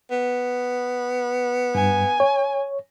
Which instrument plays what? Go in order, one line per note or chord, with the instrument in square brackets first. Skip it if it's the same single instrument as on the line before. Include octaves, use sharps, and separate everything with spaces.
[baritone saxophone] B3
[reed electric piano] G2 [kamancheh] G#5
[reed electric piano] C#5